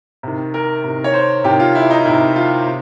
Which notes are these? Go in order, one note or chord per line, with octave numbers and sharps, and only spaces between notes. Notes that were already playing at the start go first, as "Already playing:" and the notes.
C3 D#3
A#4
C3 D#3
C#5
C5
C3 D#3 G4
F4
E4
D#4
C3 D#3 E4
F4
C3